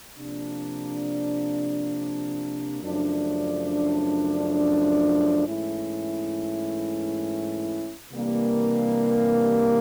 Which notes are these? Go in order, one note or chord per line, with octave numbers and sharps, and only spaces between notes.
C3 F3 A#3 D4
F#2 C#3 F3 A3 D4
G#2 E3 A3 C#4 E4
C3 E3 G3 A#3 D4